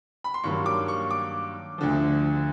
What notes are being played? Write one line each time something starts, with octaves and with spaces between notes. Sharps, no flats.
B5
C6
G2 D#3 F#3 A#3 C#6
D6
C#6
D6
D2 D3 F3